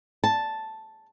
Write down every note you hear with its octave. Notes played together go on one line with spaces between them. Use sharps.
A5